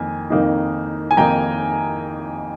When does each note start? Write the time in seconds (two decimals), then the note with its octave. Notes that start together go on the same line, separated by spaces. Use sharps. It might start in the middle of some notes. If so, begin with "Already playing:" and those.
Already playing: F2 D#3 A#3 G#5
0.30 F2 D#3 A#3 D#4
1.11 G#5
1.17 F2 D#3 A#3 D#4 G5 A#5